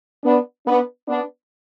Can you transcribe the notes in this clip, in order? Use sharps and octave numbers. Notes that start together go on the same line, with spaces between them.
B3 D4
B3 D4
B3 D4